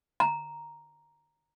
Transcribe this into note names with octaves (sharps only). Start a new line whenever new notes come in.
A#5